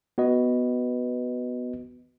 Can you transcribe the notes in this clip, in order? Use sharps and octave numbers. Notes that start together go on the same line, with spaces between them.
B3 F#4 B4 D#5